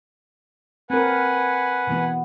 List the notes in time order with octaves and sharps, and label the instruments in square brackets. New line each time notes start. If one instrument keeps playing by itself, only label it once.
[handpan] C4 A#4 [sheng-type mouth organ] B4 F#5 G#5
[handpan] B2 E3 B3